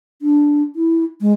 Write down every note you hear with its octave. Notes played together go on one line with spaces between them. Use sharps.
D4
E4
G#3